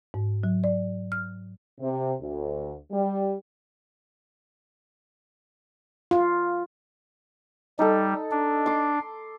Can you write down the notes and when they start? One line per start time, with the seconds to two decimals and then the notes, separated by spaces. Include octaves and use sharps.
0.14 G#2
0.43 F#3
0.64 D5
1.12 F6
1.80 C3
2.20 D2
2.91 G3
6.11 F4
7.79 G3 D#4 A4
8.31 D4
8.66 C6 D6